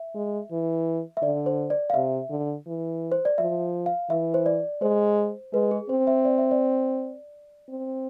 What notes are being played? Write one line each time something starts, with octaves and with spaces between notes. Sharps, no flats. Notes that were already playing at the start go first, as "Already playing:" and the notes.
Already playing: E5
G#3
E3
E5
D3 D5
C5
D5
F5
C3 E5
D3
E3
C5
D5
F3 E5
F5
E3 E5
C5
D5
G#3 C5
G#3 B4
G#4
C4 C5
E5
D5
E5
D5
C4